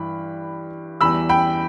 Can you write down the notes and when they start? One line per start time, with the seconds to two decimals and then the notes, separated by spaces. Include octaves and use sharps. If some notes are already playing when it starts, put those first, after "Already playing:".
Already playing: G2 E3 B5
1.01 E2 E3 G3 B5 E6
1.29 G5 B5